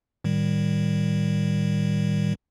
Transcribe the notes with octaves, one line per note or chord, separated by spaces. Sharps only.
A2 D#3 G3